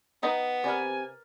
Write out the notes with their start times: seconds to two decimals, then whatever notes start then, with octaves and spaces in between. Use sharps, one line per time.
0.23 B3 D#4 G5 A#5
0.64 C3 A#4 B4 D5 G#5